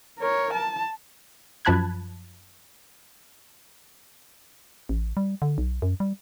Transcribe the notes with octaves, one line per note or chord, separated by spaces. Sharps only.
A#4 C#5
A5
F#2 F3 A5 B5 F#6 G#6
A1
G3
D3
B1
F#2
G3